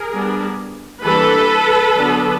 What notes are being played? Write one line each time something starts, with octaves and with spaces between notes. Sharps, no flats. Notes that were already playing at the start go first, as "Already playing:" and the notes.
Already playing: G#4 A#4
G3 B3 D4
E3 G3 A#3 D4 A4 B4
D3 F#3 B3 D4